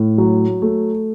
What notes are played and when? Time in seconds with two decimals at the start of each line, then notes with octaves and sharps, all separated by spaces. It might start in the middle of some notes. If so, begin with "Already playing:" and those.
Already playing: A2
0.18 F#3
0.62 A3